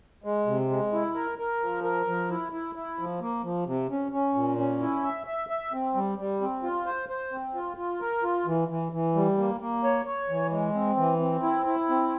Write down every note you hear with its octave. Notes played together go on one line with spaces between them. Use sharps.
G#3
C3
G#3
E4
A#4
A#4
F3
A#4
F3
E4
E4
E4
F3
A#3
F3
C3
C#4
C#4
A#2
C#4
E4
E5
E5
E5
C4
G3
G3
C4
F4
C5
C5
C4
F4
F4
A#4
F4
E3
E3
E3
G3
A#3
A#3
C#5
C#5
E3
G#3
C4
E3
C4
E4
E4
C4